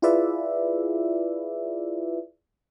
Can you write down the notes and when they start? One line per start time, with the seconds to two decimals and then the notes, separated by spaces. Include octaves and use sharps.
0.02 E4 F4 G#4 B4 D5 E5